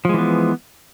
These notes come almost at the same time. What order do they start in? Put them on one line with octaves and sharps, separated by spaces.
F3 G#3 E3 B3